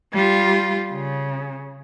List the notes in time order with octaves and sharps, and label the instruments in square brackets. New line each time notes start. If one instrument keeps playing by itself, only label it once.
[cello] G3 F4
C#3